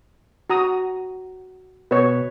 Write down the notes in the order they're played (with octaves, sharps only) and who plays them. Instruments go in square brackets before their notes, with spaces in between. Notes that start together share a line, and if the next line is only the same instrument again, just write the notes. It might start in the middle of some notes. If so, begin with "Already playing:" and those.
[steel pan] F#4 A#5 D#6
[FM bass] B2 [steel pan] B4 C#5